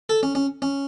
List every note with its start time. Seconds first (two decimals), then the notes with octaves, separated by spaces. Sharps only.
0.09 A4
0.23 C#4
0.35 C#4
0.62 C#4